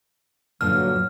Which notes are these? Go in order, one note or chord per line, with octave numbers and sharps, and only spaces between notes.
G2 A#2 D3 F#3 F6